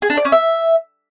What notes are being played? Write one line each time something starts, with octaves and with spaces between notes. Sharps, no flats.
G#4
D4
D5
C#4
E5